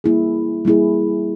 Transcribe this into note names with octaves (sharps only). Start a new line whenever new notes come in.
G3 A#3 E4 G#4
G3 A#3 E4 G#4